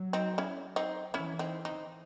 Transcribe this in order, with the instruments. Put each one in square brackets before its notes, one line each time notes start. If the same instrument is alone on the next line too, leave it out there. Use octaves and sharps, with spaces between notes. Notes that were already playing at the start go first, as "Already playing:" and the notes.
Already playing: [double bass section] F#3
[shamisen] C4 D#4
C#4 E4
C4 D#4
[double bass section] E3 [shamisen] C#4 E4
[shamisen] C4 D#4
C4 D#4